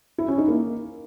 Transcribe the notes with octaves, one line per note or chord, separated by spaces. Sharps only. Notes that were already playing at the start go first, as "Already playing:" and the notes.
E4
C#4
D#4
A#3